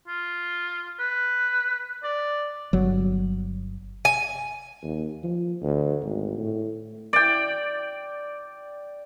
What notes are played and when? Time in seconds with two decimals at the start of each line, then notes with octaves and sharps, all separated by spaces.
0.07 F4
0.99 B4
2.04 D5
2.73 G1 F#3
4.05 G#5
4.83 D#2
5.24 F3
5.62 D2
6.02 G#1
6.38 A2
7.13 D5 G5